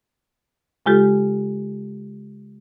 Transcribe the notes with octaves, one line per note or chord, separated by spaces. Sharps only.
C#3 G#3 F4 G4 A4